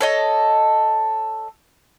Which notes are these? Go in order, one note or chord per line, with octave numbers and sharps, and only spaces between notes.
A4 C#5 D#5